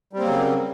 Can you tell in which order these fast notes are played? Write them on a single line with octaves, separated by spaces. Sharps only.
G3 C4 A#3 F#3 C#3